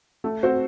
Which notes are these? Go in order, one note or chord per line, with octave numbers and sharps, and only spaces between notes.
A3
C4 F#4 C5